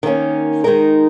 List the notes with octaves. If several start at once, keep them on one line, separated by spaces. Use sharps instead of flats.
D#3 A#3 C#4
D#3 G#3 D#4 A#4